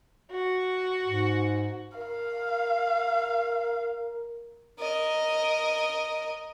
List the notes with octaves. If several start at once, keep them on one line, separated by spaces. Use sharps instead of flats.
F#4
G#2
A#4 F5
A#4 D#5